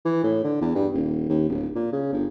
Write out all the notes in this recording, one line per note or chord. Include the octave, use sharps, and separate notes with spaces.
E3
A2
D3
E2
G2
D#1
D#2
D1
A#2
C#3
G1